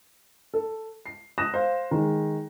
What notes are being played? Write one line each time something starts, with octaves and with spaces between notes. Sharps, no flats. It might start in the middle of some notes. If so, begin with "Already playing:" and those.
A4
C7
D#6 F#6 A#6 E7
C5 F5
D#3 G#3